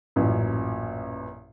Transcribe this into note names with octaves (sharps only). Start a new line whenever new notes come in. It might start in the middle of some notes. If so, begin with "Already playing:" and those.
A1 F#2 A#2